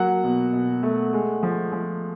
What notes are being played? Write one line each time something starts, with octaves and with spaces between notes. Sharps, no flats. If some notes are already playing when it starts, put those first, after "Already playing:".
Already playing: F#3 A#3 F#5
B2
B2
A3
G#3
F3
F3